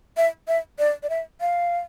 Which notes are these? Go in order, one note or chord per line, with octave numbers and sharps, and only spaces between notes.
E5
E5
D5
D5
E5
F5